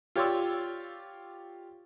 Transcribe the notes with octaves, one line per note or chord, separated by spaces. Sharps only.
F4 G4 C#5 D5 C6 E6